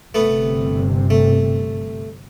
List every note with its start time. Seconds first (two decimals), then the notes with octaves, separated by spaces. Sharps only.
0.14 G1 C3 A3 B3
1.10 A3